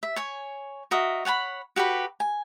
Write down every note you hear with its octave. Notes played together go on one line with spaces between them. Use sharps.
E5
C#5 G#5
F#4 A#4 D#5 E5
C#5 F#5 G#5 B5
F#4 G4 A4 B4
G#5